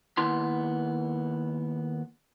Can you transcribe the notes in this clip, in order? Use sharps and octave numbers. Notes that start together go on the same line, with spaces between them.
D#2 B3 E4 C6